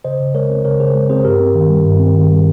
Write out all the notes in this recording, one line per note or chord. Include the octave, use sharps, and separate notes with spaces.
C#3 C5 D#5
C#3
G#3 A#4 C#5
C4
C#3 A#4 C#5
C#3 G#4 C5
G#3
C4 G#4 C5
G2 G4 A#4
C4
D#3
G3
G2
C4
D#3
G3